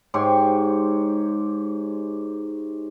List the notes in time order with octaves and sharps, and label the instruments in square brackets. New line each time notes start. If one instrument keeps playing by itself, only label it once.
[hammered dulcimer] G#2 G4 C#5 C6